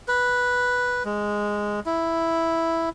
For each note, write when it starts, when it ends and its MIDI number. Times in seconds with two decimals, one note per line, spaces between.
0.08 1.03 71
1.05 1.80 56
1.86 2.89 64